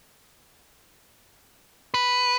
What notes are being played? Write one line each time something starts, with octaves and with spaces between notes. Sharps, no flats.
B4